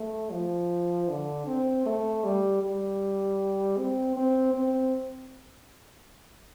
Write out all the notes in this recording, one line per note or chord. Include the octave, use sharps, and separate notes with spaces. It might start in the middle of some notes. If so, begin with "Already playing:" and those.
Already playing: A3
F3
D3
C4
A3
G3
G3
C4
C4
C4